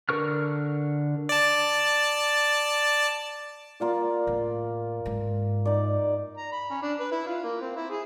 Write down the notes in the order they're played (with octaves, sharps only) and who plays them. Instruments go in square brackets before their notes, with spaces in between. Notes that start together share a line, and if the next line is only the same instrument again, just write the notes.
[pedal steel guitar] D3 A#4 C#6 F6
[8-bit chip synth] D5 A5
[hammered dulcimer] A#3 F4 D5
[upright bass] A2
G#2
[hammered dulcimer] D#4 D5
[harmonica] A#5
B5
C#4
D4
B4
E4
F4
A#3
C4
E4
G#4